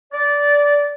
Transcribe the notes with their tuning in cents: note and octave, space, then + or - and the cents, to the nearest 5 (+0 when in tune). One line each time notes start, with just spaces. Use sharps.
D5 -15